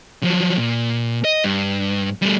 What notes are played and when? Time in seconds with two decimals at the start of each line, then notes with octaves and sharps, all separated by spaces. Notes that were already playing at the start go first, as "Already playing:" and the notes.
0.23 F3 F#3
0.57 A#2
1.25 D#5
1.44 G2
2.22 G3 A3